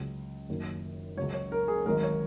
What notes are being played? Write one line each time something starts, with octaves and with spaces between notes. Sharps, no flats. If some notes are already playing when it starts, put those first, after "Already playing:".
Already playing: C#2 C#3 F#3
F#1 F#2 D#3 F#3
C#2 C#3 F#3 C#5
C#5
A#4
G#4
G#1 G#2 D#3 F#3 A#4
C#5